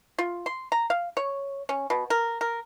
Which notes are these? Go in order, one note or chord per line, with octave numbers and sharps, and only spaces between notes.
F4
C6
A#5
F5
C#5
C#4
B2
A#4
A#4